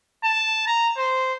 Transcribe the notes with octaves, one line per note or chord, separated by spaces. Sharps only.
A5
A#5
C5